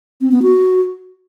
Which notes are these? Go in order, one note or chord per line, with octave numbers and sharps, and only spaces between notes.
C4
B3
F#4